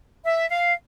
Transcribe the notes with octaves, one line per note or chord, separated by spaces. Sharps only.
E5
F5